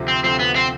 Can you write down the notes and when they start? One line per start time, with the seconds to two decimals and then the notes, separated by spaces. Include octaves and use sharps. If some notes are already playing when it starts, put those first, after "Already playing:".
Already playing: D2 C3 F3
0.08 C4
0.24 D2 C3 F3 C4
0.39 B3
0.56 C4